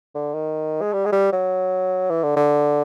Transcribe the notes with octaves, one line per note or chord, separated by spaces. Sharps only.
D3
D#3
G#3
G3
G#3
G3
F#3
E3
D3
D3